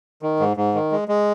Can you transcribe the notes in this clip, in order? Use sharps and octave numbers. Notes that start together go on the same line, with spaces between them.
D#3
G#2
G#2
D#3
G#3
G#3